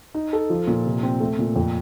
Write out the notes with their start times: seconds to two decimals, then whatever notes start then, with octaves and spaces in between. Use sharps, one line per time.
0.14 D#4
0.33 A4
0.50 F3
0.67 A#2
0.85 C3
1.03 C4
1.20 A3
1.39 A#2
1.56 F2